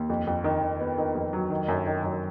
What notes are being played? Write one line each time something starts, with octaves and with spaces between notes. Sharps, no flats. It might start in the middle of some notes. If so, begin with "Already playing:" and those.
Already playing: D#2
F2
F2
D#3
D#3
B3
D#3
F2
F#3
D#3
F#2
D#3
F#2